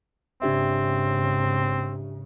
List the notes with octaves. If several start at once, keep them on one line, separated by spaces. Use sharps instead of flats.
G#1 C#3 C4 D4 G4 E5